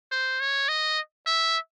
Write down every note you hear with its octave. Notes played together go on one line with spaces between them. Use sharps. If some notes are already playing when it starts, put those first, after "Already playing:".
C5
C#5
D#5
E5